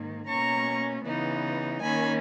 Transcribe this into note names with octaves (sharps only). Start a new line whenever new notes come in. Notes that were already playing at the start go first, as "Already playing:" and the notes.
Already playing: G#2 D#3 A#3
B2 A#3 C#4 A#5 C#6
C#3 E3 B3 D#4
D#3 A#3 C#4 G#5 B5